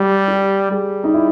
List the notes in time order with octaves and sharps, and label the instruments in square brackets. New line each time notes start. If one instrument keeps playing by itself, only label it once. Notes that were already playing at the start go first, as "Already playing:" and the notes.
Already playing: [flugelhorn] G3 [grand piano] G4
[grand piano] G4
[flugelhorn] G3 [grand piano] G#4
[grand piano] D#4
E4